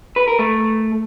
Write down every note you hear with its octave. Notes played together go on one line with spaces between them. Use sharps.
B4
A#4
A3